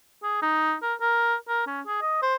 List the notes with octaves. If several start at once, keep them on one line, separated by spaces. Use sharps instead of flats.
G#4
D#4
A#4
A#4
A#4
C#4
G#4
D#5
C5